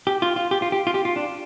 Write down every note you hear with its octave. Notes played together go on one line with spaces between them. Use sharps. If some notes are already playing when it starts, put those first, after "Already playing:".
G4
F4
F4
G4
F4
G4
F4
G4
F4
D4